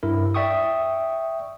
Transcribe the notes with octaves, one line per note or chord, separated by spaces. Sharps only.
G2 E4 A#4
D5 E5 G5 C#6 D#6